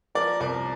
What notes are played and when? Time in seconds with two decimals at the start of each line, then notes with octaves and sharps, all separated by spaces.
0.15 F3 A#4 D5
0.40 C2 A#4 D5